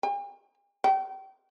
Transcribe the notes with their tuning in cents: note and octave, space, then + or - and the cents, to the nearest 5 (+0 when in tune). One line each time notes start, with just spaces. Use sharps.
G5 +45
G5 -35